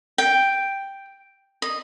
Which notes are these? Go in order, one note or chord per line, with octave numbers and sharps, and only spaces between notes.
G5
D#5